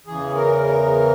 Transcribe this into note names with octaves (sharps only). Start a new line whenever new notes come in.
E2 C#3 E3 G#4
A#4
A#4